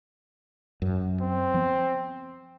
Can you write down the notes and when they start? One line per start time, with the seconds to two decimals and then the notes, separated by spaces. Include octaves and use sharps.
0.82 F#2
1.21 C4
1.54 F3 B3